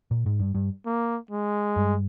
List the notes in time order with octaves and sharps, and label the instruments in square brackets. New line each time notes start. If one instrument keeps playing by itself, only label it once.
[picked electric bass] A#2
G#2
G2
G2
[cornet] A#3
G#3
[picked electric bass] G2